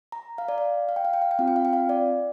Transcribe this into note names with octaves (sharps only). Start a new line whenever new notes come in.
A#5
F5
D5
F5
F5
G5
F5
G5
F5
G5
C4 F4 F5
G5
F5
G5
F5
D5